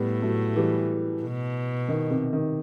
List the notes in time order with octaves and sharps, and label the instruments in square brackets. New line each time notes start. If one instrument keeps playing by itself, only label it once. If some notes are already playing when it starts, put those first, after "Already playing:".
Already playing: [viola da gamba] A2 [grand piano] G3 B3
[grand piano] F#3 A3
E3 G3
[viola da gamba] B2
[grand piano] D#3
C3
D#3